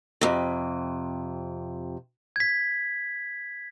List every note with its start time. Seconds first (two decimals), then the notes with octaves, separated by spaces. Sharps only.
0.21 F2 C3
2.36 G#6 B6